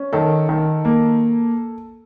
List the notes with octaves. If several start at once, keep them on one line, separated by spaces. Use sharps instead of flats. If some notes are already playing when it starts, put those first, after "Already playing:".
Already playing: C#4
D#3 A4
D#3
A#3